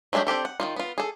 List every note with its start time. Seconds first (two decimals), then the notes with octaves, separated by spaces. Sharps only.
0.13 F#3 G#3 A3 D4 G4
0.27 C4 D4 G4 A4
0.45 F#5
0.60 D#3 A#3 F4
0.76 B3 F4
0.98 G#4 A4